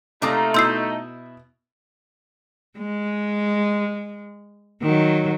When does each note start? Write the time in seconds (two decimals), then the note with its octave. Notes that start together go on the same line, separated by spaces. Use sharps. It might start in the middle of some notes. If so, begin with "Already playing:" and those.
0.22 C3 A3 A#3 D#4 F4 A#5 D6 D#6
0.54 B2 E4 C6 D#6 E6 G6 C7
2.78 G#3
4.82 D#3 F#3